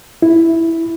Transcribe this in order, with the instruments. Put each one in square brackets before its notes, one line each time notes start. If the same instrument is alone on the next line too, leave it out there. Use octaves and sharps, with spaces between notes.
[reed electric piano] E4